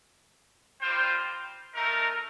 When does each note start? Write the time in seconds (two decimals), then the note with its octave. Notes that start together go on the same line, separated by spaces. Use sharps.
0.81 G3 C4 F4 C5 G5
1.74 A3 D#4 A#4